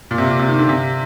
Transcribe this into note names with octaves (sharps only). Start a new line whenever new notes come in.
A#2
C3
A#2
C3
D#3
D3
C3